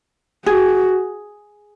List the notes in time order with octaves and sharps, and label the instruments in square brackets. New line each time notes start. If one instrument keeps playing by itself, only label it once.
[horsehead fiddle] F#4 [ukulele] G#4